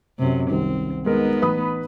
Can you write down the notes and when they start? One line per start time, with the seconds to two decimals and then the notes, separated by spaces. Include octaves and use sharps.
0.19 F#2 C3
0.50 C2 D#3 C4
1.06 G#3 B3 D#4 A#4
1.42 A1 B4 B5 D#6